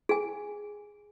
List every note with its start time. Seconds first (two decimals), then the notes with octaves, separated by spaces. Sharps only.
0.09 G#4 G#5